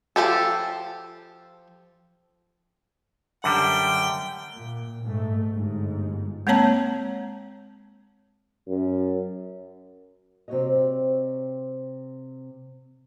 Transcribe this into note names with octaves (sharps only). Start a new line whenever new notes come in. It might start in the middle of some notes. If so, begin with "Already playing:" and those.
F3 G#3 G4 A4
F#2 D3 G3 G5
A#2
G#2 A3
G1 G#2
G#3 A#3 C4 C#5 A5 A#5
F#2
C3 C4 D#4 F#4 C#5 D#5